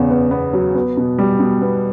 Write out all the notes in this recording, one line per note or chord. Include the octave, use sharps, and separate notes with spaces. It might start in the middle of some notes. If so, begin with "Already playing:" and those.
Already playing: E2 C#3 B3
B3
B3
F#3
B3
B2
G3
B2
B3